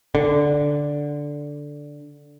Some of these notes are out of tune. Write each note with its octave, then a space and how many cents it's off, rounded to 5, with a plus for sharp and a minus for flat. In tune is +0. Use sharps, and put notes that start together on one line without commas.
D3 -5